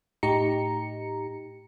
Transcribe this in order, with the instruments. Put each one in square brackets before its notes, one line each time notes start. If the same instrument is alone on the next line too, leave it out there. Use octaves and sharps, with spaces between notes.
[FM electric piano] A2 D#4 G4 A#5 C#7